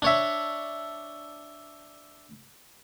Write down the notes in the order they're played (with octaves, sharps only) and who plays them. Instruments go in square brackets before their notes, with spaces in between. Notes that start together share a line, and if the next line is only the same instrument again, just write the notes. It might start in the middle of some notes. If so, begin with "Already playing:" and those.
[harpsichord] D4 C#5 E5